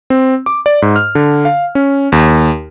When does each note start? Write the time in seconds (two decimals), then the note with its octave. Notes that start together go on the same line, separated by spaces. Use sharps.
0.10 C4
0.46 D6
0.66 D5
0.82 G#2
0.96 F6
1.15 D3
1.45 F5
1.75 C#4
2.12 D#2